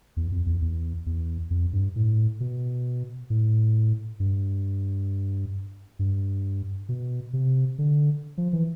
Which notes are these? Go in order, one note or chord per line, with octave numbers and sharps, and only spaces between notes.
E2
F2
E2
E2
E2
F2
G2
A2
B2
A2
G2
G2
B2
C3
D3
F3
E3